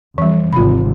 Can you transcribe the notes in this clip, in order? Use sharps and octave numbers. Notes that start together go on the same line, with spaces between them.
F2 E3 G3
G#1 C3 F4 B5